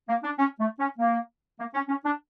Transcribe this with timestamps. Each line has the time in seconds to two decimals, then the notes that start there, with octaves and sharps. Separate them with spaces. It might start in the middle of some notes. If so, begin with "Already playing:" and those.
0.08 A#3
0.23 D4
0.39 C#4
0.59 A3
0.79 C#4
0.99 A#3
1.59 A#3
1.74 C#4
1.89 C#4
2.04 D4